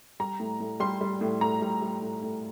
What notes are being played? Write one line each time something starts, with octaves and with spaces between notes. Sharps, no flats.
G3 A#5
A2
A2
G3 C6
G3
A2
A2 A#5
G3
G3
A2
A2